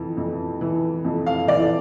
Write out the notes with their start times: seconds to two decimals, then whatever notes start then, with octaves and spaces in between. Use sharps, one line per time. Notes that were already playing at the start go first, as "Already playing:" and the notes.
Already playing: F2 E3
0.17 F2
0.61 E3
1.05 F2
1.26 F5
1.47 E3 D5